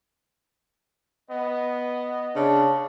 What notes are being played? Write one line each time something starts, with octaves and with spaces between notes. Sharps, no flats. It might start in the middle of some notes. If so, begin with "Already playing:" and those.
B3 D#5
C#3 D4